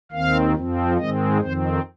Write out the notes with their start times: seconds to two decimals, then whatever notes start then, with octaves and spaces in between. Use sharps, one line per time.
0.12 D#2 D#3 C4 F5
0.55 F2 F3 C4
0.97 G#2 D#3 G#3 C4 D#5
1.40 F2 D#3 C4 C5